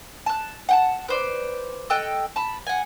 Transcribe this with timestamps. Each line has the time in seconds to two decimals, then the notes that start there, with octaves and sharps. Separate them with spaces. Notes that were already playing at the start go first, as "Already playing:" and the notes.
0.26 A5 F#6
0.69 F#5 G5 A5
1.08 B4 C5 D5
1.90 A4 D#5 G5 F#6
2.36 A5 B5
2.67 F#5 G#5